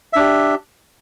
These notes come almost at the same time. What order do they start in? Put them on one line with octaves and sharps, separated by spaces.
E5 D4 G4